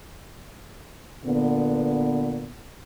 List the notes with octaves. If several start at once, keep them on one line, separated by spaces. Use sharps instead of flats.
A#2 D3 B3